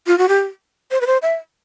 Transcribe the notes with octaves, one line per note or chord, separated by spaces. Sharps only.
F4
F#4
G4
C5
B4
C5
E5